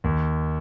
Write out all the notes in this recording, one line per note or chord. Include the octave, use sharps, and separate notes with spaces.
D#2